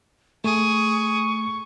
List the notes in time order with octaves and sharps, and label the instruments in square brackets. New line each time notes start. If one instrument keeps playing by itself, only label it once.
[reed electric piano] A3 [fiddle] G#4 [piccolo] C#6